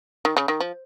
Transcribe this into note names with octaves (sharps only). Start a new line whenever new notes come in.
D#3
C#3
D#3
F3